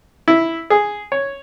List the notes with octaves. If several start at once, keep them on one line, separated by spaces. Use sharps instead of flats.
E4
G#4
C#5